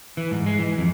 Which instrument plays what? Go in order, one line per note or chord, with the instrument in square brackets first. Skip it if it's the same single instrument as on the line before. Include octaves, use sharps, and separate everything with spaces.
[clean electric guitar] E3
G#2
G#3
E3
F2